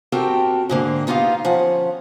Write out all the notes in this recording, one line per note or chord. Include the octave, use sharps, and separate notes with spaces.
C4 F#4 G4 A4 A#4 G5
G#2 D3 A#3
B3 D#4 F4 G4 F5
F3 C#4 F#5